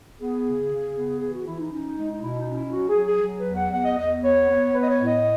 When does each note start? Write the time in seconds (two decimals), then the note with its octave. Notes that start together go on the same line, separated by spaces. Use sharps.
0.20 B3 G#4
0.45 C#3
0.71 C#3
0.96 B3
1.20 E3 G#4
1.33 F#4
1.46 E3 E4
1.59 D#4
1.71 C#4 D#4
1.96 G#3
2.12 D#4
2.22 B2 E4
2.38 D#4
2.47 C#4
2.55 E4
2.71 F#3 F#4
2.89 G#4
2.97 F#3
3.05 G#4
3.22 F#3
3.39 B4
3.48 E2
3.55 F#5
3.72 E2 F#5
3.85 D#5
3.97 E2 D#5
4.23 B3 C#5
4.48 B3
4.73 B3 B4
4.82 D#5
4.90 C#5
4.99 A2
5.07 D#5